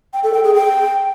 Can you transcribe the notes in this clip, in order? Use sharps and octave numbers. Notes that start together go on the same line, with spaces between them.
G5
A4
G5
G#4
G5